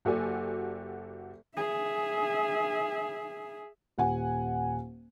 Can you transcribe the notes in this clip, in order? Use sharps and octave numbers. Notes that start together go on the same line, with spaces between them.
F#1 F#4 G4 A4 D5 G#5
G#4 E5
D#1 F#5 G#5